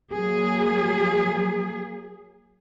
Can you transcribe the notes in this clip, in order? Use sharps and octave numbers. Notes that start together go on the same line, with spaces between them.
F#3 A#3 G#4